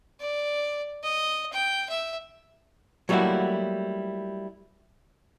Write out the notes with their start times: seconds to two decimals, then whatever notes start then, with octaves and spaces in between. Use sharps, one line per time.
0.20 D5
1.03 D#5
1.52 G5
1.89 E5
3.09 F#3 G3 A3 A#3 E4 F#4